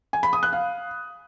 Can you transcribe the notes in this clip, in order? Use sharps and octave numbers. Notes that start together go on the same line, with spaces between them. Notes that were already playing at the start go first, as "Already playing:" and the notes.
G#5
B5
D#6
F#6
F5